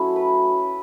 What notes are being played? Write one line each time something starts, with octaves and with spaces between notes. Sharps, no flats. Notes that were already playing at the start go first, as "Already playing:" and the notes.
Already playing: F#3 A3 C#4 E4
B4